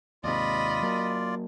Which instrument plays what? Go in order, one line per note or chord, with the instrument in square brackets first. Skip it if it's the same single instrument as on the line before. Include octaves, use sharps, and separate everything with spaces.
[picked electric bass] D#2 G#2 C3 [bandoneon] F4 D5 [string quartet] D#5 B5
[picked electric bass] F#3 A#3